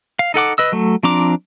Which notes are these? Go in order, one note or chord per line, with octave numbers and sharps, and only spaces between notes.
F5
D#4 A4 F#5 D6
B4 D#5 E6
F#3 A3
F3 C4 D4 A#5 D6